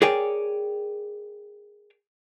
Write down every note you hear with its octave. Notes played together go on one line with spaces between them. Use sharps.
G#4 A#4 C#5 D5 G5 G#5